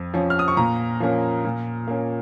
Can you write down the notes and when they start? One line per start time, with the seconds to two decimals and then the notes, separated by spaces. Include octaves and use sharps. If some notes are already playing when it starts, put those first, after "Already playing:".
Already playing: F2
0.14 F3 C#4
0.30 F6
0.39 D#6
0.48 C#6
0.57 A#2 A#5
1.00 F3 A#3 C#4
1.45 A#2
1.87 A#3 C#4